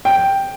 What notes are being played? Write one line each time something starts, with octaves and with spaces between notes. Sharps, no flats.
G5